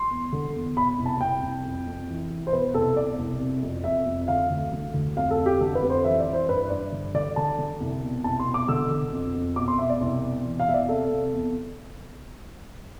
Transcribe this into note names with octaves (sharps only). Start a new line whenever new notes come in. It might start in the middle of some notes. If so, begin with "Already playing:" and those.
Already playing: C6
E2
D3
E2
B2 B5
C2
A5
C2 G5
C2
F2
F2
E3
E3
C5
B2 B4
C2 A4
B2 D5
C2
C3
F2
F2 E5
F2
D3 F5
D2
D3
D2
F2 F5
A4
F2
G4
D3 A4
B4
F2
C5
E3 E5
D5
E3
C5
G2 B4
G2 D5
D3
D3 D5
D3 A5
D3
C2
B2
C2 A5
C6
B2
D6
D3 E6
D3
F2
F2
B2 D6
C6
B2 E5
D5
C2
B2
E3
F5
E2 E5
D5
C3 A4
C3
E2